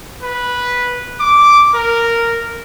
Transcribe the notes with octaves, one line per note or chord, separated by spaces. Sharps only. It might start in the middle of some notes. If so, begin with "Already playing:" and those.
B4
D6
A#4